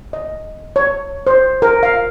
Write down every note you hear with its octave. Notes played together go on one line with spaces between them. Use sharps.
D#5
C#5
C5
A#4
F5